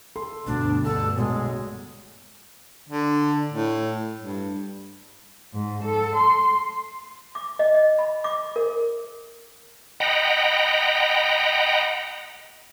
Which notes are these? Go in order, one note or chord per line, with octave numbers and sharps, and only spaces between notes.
A4 C6
D2 G2 B2 A3 D4
G2 B2 D3 A3 A4 A5
B1 G#3
D3
A2
G2
G#2
A4
C6
D6
D#5
D#5
B5
D6
A#4
D#5 F#5 G5 A#5 B5